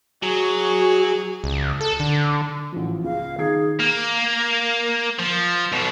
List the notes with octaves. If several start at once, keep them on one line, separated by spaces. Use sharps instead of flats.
F#3 F#4 G#4
C#2
A4
D3
A1 F3
C#2 F5
D#3 G#4 G#6 C7
A#3
F3
B1 B2